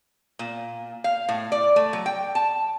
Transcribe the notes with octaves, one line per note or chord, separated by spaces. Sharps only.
A#2
F5
A2
D5
A3
F#3
G5
A5